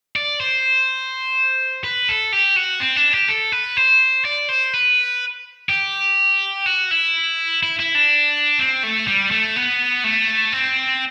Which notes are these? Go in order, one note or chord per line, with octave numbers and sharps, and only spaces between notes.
D5
C5
B4
A4
G4
F#4
C4
D4
G4
A4
B4
C5
D5
C5
B4
G4
F#4
E4
E4
E4
D4
C4
A3
G3
A3
B3
A3
C4